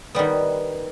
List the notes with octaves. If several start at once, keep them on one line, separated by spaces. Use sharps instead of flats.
D#3 G3 B3